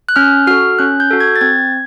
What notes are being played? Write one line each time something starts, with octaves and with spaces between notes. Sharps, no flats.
F#6
C#4 F6
F#4 A4 F6
C#4 F#6
G6
F#4 A4
G#6
A6
C4 G#6